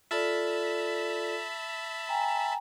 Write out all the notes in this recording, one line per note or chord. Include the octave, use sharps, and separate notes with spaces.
F4 A4 D5 E5 A5 B5
G5 G#5 A#5